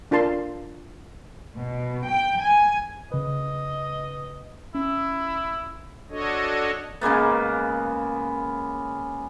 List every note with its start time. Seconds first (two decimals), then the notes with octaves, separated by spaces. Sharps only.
0.11 D4 F4 A#4 A5 C6
1.56 B2
2.07 G5
2.40 G#5
3.12 C#3 B4 D#5
4.75 C#4 E4
6.10 D4 F#4 A4 C#5 D#5
7.01 C#3 G#3 A#3 B3